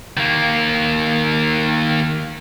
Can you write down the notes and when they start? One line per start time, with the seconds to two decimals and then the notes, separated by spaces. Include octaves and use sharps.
0.17 D#3 A#3